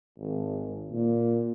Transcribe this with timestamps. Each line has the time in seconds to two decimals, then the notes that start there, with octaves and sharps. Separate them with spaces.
0.18 G#1
0.91 A#2